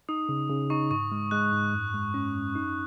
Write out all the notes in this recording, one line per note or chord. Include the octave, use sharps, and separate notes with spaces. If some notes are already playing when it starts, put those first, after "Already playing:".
D#4 D#6
C#3
C#3
D#4 C#6
G#2 C#6
G#3
G#3 F#6
G#2
F#2
G#3
C#4
F#2
D#4